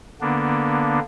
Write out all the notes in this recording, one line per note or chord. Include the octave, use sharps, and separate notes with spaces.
D3 A#3 B3 D4